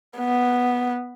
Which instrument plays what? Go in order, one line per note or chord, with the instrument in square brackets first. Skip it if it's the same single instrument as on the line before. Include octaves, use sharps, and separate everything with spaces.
[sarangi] B3